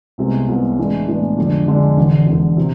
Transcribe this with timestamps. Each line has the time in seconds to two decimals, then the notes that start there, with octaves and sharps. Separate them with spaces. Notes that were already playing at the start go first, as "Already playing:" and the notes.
0.18 C2 C3 G#3 B3
0.48 C2 C3 G#3 B3
0.78 A2 E3 G#3 B3 D4
1.08 A2 E3 G#3 B3 D4
1.38 F2 D3 G#3 D4
1.67 F2 D3 G#3 D4
1.97 E1 E2 D3
2.27 E1 E2 D3
2.57 C3 E3